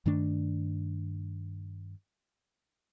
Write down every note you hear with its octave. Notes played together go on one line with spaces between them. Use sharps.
G2 D#3 A3 D4